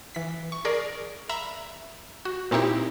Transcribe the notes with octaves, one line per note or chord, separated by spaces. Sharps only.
E3 B6
C#6
G#4 A#4 D5
E5 A#5 B5 E6
F#4
A#2 C4 D#4 E4 G4